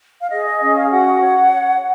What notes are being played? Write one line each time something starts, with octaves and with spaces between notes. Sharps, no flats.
F5
G#4 D#5
D#5
C#4 D#5
F5
F#4 F#5
C#5
C#5